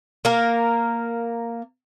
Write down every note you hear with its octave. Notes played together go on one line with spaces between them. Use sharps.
A#3 A#4